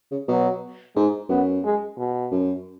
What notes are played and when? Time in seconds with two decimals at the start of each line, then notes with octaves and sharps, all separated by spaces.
0.12 C#3
0.28 B2 F#3
0.96 G#2 G#3
1.29 F#2 B3
1.64 G#3
1.97 B2
2.31 F#2